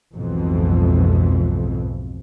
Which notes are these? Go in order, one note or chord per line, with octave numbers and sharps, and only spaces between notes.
B1 F2 G#2 B2 E3